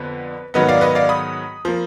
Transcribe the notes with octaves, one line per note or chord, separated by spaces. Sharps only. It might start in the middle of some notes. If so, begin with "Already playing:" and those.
Already playing: F2 D3 B3 B4
G#2 D#3 F#3 B3 B4 D#5
D5 F5
B4 D#5
D5 F5
B5 D#6
F3 A#3